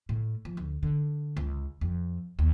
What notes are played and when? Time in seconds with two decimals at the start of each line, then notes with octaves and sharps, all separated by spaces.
0.09 A2
0.45 F3
0.57 D2
0.83 D3
1.37 C#2
1.81 F2
2.39 D#2